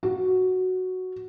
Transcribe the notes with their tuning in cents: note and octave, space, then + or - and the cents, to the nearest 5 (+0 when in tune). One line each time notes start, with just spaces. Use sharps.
F#4 +0